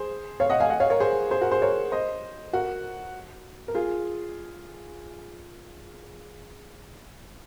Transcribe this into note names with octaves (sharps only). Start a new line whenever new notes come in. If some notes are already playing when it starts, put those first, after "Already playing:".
Already playing: G#4 C5
C#5 F5
D#5 F#5
F5 G#5
D#5 F#5
C#5 F5
A#4 C#5
G#4 C5
G#4 C5
F#4 A#4
G#4 C5
A#4 C#5
C5 D#5
F#4 A#4
A#4
F4 G#4